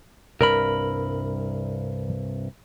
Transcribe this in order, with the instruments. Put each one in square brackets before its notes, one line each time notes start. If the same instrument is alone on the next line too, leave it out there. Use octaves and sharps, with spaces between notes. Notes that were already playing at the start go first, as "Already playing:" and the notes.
[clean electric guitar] C2 G2 B5 [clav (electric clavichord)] A#4